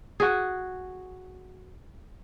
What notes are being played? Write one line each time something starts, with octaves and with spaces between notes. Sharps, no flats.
F#4 G#4